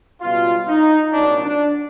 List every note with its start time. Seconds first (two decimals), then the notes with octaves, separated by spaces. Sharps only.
0.22 C#2 B2 G3 F4
0.67 D#4
1.11 C2 A#2 F#3 D4
1.42 D4